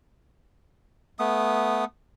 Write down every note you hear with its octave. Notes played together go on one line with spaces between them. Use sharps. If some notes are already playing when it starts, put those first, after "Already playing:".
A3 B3 D#6